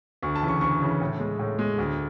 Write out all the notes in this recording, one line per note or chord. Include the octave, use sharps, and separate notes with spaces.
D2 C#6
A5
C#3 E3
C#6
D2 C#6
C#3 E3
A2
G#3
A2
G#3
D2